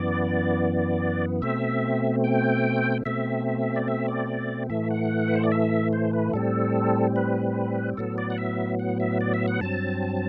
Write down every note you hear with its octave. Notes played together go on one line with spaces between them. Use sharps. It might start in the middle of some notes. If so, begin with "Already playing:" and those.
Already playing: F#2 E3 B3 D5
B2 A3 C4 E5
G5
B2 A3 C4 E5
D5
E5
D5
A2 E3 A3 E5
F#5
B4
C5
D5
E5
C5
B4
A2 G3 C4 A4
B4
A2 F#3 B3 A4
D5
F#5
E5
F#5
E5
D5
E5
F#5
G2 F#3 C4 A5